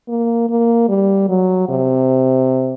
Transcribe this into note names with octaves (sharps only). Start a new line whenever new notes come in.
A#3
A#3
G3
F#3
C3